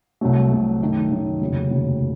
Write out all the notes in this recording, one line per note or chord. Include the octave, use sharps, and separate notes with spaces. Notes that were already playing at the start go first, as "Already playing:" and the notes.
C2 C3 F#3 A3
C2 C3 F#3 A3
F#2 D#3 A3 D#4
F#2 D#3 A3 D#4
F1 D#2 C#3 F#3
F1 D#2 C#3 F#3